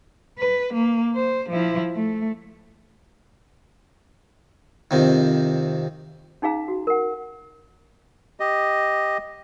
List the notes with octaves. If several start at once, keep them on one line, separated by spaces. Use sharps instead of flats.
B4
A#3
C5
F3 E4
A3
F2 C3 D#3
C#4 D#4 G#4 F5 A#5
F#4
A#4 F#5
G4 D#5